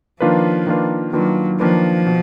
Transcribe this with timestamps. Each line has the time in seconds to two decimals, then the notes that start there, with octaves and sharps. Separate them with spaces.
0.20 D#3 F3 A#3 D4 F4 B4
0.67 D#3 A#3 D4 F4 B4
1.13 D#3 F#3 A#3 D4 F4 B4
1.60 D#3 F3 A#3 D4 F4 B4
2.07 B2